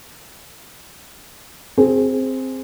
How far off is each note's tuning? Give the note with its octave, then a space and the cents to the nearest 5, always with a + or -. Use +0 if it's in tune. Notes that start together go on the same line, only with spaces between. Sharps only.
C4 +0 G#4 +0